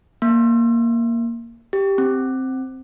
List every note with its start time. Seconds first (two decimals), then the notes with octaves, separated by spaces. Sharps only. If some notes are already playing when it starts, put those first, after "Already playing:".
0.22 A#3
1.73 G4
1.98 C4